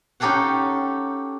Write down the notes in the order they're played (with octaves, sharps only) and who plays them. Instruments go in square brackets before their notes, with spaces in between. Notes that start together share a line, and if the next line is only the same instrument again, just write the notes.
[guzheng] C#4 D#4 G4 A4 F5 F#5